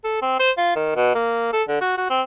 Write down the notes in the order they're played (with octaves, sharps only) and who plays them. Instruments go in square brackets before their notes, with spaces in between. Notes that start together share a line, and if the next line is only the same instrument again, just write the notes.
[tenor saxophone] A4
C4
C5
F4
D#3
B2
A#3
A4
D3
F#4
F#4
C4